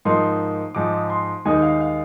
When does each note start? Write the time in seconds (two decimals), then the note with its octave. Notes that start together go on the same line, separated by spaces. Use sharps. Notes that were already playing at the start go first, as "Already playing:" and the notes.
0.05 G#2 F3 A#3 D#4 C6
0.75 G#2 F3 G#3 D#4 D6
1.10 C6
1.45 D#2 D#3 G#3 D#4 G#5
1.62 F5
1.80 F5